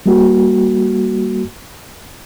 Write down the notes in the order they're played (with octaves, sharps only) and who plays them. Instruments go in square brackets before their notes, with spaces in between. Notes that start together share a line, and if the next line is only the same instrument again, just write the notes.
[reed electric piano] G3 A#3 F#4